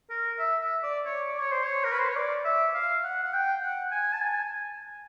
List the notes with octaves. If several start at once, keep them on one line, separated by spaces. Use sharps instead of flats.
A#4
E5
E5
D5
C#5
D5
C#5
C5
C#5
A#4
B4
C5
C#5
D5
E5
F5
F#5
F#5
G5
F#5
G#5
A5
G#5